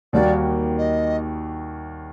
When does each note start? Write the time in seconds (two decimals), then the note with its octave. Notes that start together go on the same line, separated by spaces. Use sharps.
0.13 D#2 D#3 G3 A#3 F#4 D5
0.78 D#5